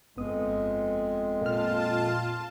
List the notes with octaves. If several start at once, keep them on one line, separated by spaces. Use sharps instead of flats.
G1 F2 G#3 B3 D#6
A#2 F4 A5 F6